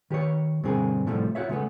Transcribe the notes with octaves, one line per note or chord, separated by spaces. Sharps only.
D#3 G4 B4 C#5
G2 B2 D3 C4 G#4 A#4
A2 C3 F3 G3 A3
F4 F#4 G#4 C#5 E5
C#3 G#3 A3 B3